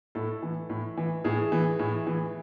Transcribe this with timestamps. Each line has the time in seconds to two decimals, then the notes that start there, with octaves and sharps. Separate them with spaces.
0.15 A2 A4
0.43 E3
0.70 A2
0.97 E3
1.24 A2 G#4
1.52 E3
1.79 A2
2.07 E3